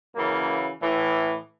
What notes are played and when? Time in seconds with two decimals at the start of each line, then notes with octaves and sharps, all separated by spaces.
0.15 F#2 C#3 E3 A#3
0.82 A2 E3